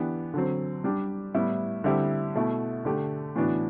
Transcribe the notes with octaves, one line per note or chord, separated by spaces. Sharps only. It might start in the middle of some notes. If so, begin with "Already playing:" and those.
Already playing: E3 B3 D4 G4
D3 F#3 C4
G3 D4 G4
A2 G3 B3 E4
D3 G3 C4 E4 G4
B2 A3 E4
D3 A3 D4 G4
A2 E3 B3 D4 F#4